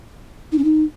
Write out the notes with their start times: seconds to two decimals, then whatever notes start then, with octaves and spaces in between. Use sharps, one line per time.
0.52 D#4
0.58 C#4
0.64 D#4